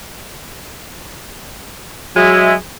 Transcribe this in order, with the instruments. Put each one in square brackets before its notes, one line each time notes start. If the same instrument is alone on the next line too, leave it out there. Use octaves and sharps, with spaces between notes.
[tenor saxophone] F#3 [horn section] G#3 E5